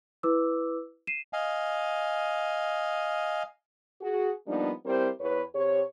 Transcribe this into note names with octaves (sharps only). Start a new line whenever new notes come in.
E4 B4 D6 E6
C7 D#7 E7
D#5 F5 G#5
F#4 G#4
F3 G3 A#3 B3 D4 D#4
G3 C4 E4 G4 A#4 C5
E2 B4 C#5
C3 G4 C5 C#5